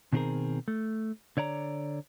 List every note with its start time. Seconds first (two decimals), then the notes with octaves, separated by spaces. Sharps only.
0.13 B2 D#3 C4 G4 G#4 A#4
0.68 A3
1.37 D3 C#5 D5 A#5